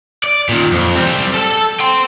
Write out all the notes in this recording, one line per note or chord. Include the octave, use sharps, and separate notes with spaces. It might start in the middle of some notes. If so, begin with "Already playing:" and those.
D5
A#2 D#3
F2
G3 C4
A4 A5
G5 C6